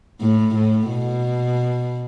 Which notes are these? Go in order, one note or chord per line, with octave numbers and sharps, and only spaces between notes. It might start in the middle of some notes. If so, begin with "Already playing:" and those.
A2
A2
B2